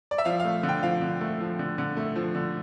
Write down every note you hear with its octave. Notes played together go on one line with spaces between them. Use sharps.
D5
E5
F3 F5
F5
A3
D3
G5
F3 F5
D3
A3
F3
D3
D3
A3
F3
D3